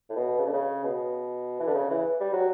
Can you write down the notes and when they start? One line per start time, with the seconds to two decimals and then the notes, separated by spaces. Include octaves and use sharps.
0.10 A2
0.16 B2
0.39 C#3
0.47 D3
0.54 C#3
0.84 B2
1.60 E3
1.67 D3
1.75 C#3
1.90 E3
2.20 G3
2.34 F#3